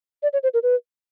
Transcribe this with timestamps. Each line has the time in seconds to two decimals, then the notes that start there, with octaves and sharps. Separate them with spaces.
0.23 D5
0.33 C#5
0.43 C5
0.54 A#4
0.63 B4